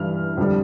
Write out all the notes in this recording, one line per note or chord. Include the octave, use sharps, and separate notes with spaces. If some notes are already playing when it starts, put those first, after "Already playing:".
Already playing: G2 E3 G3 F6
F2 D3 G3